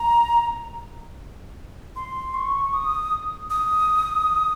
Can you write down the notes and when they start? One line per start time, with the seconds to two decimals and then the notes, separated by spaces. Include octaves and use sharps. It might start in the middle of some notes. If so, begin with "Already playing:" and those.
Already playing: A#5
1.96 C6
2.34 C#6
2.74 D#6
3.50 D#6